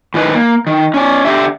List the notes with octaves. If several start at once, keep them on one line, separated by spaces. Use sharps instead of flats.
A2 D#3 B4
A#3
D#3
C#4 D5
D3 G4 E5